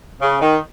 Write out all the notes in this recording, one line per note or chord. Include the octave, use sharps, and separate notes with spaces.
C#3
D#3